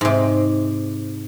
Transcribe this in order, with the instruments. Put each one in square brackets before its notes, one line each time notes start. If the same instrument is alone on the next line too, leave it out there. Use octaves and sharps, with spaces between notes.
[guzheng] G#2 C3